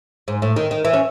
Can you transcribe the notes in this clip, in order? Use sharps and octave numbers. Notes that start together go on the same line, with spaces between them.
G#2
A2
D#3
D#3
E3
C#4